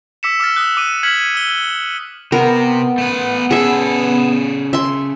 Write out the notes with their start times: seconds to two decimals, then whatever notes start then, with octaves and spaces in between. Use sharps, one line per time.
0.23 D6 E6 B6 C#7 E7
0.40 D6 E6 F6 A6
0.56 D#6 F#6
0.77 D6 D#7
1.03 F6 G#6 B6 C#7 F#7
1.35 E6 G7
2.32 C3 B3 A#4
2.98 A3 B4
3.51 C#3 G#4 A4 E5
4.73 E5 C6